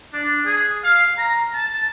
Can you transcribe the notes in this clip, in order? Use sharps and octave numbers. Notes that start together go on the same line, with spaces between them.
D4
G#4
F5
A#5
A5